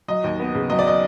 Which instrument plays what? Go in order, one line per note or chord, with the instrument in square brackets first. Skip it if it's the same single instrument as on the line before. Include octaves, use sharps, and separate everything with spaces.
[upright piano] F#3 D#5
D#2
B3
C#3
F#3 D#5
D5
D#5